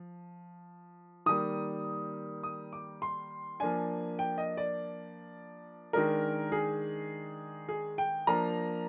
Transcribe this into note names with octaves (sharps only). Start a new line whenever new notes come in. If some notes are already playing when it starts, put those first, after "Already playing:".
Already playing: F3
D#3 G3 A#3 D#6
D#6
D6
C6
F3 A#3 D4 G#5
G5
D#5
D5
D#3 G#3 D4 A#4
G#4
G#4
G5
F3 A#3 D4 A#5